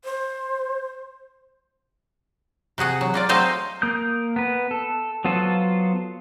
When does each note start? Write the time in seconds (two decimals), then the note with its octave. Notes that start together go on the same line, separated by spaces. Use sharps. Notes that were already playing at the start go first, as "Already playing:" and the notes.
0.05 C5
2.78 C3 F#4 G#4 F#5
3.01 F#3
3.14 A#3 F4 D5
3.29 F#3 A3 C4 C5 D#5 F5
3.82 A#3 D#6 G6
4.36 B3 B4
4.71 A4
5.25 F#3 B3 F4 A4 C5